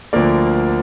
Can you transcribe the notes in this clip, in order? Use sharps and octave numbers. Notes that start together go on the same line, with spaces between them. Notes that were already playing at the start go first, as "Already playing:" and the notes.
D2 D3 F3 A#3 A#4 D5